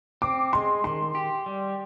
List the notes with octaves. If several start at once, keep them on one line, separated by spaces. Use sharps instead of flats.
C4 D6
G#3 C6
D#3 C6
G4
G3